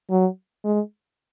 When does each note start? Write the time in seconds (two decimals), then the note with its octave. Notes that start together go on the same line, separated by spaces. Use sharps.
0.10 F#3
0.64 G#3